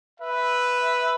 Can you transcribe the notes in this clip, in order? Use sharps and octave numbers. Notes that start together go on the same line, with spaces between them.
B4 E5